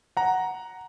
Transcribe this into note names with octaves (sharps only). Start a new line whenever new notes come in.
F#5 A#5